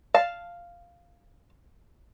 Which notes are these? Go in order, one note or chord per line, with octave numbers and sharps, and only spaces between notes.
F5 A5